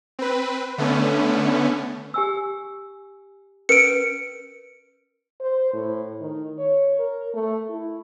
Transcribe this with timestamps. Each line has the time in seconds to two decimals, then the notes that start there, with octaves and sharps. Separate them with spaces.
0.19 C4 B4
0.78 D3 A3 B3 C#4
2.14 G4 G#5 E6
3.69 C#4 A#4 B4 C#7 D7
5.40 C5
5.73 A2
6.20 D#3
6.58 C#5
6.99 A#4
7.34 A3
7.69 E4